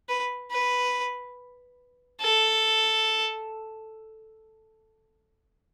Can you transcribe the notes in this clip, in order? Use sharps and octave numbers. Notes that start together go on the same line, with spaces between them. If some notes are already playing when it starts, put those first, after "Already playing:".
B4
B4
A4